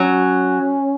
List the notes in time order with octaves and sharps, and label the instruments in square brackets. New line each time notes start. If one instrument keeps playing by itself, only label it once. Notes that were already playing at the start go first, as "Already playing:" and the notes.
Already playing: [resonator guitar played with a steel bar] F#3 [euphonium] C#4